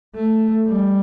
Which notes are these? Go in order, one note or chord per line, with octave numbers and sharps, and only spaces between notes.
A3
G3